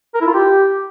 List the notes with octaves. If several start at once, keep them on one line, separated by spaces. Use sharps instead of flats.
A#4
E4
F4
G4